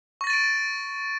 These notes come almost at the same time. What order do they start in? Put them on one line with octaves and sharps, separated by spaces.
C#6 A#6 A6 D#7 D7